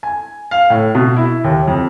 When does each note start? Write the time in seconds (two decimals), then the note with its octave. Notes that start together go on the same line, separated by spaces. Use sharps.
0.03 G#5
0.51 F5
0.70 A2
0.95 B2
1.16 E4
1.44 D#2
1.68 F2